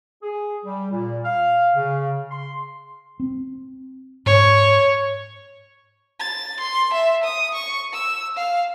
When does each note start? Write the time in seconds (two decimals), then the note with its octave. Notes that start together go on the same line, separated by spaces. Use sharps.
0.23 G#4
0.65 G3
0.91 A#2
1.24 F5
1.76 C#3
2.31 C6
3.20 C4
4.26 G#2 C#5
6.20 A6
6.60 C6
6.93 E5
7.24 D#6
7.54 C#6
7.93 E6
8.36 F5